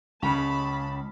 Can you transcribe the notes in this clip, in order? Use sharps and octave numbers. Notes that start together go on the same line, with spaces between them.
C#2 C#3 C#4 A5 B5